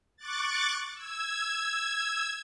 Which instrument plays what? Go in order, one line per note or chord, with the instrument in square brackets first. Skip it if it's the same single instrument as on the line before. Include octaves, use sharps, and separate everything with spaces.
[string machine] C#6 D6 F#6 A6
E6 G#6